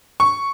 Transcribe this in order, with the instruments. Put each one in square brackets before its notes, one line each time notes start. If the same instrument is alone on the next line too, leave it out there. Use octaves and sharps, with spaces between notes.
[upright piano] C#6